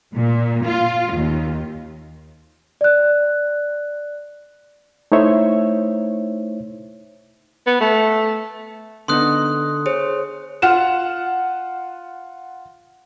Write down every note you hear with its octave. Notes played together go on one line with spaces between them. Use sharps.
A#2
F4
D#2
D5 F#6
A3 D#4 E4 C5 C#5 E5
B3
A3
D3 B3 D#4 C6 D#6 F#6
G#4 C5 C#5
F4 F#5 F6 E7